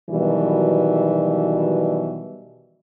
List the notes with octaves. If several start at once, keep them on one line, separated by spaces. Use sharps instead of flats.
B2 D#3 E3 F#3 G3